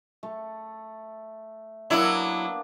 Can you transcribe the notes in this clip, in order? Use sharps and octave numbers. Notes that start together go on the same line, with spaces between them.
A3
F#3 A#3 B3 D4 E4